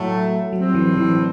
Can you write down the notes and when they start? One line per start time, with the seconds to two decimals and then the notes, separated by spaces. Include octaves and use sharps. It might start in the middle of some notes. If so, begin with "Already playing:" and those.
Already playing: A2 F#3 A3
0.53 A2 F#3 G3 C4
0.75 E3
0.97 E3